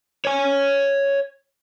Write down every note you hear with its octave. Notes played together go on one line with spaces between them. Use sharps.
C#5 G#5